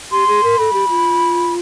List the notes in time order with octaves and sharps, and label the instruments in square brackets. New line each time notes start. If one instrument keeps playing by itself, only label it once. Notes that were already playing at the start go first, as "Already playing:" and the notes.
[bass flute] G4 [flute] C6
[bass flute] G#4
A#4
[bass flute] A4 [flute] B5
[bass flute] G4
F4